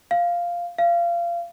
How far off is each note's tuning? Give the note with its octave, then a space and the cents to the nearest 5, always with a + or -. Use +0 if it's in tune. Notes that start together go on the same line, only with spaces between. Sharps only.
F5 -5
F5 -25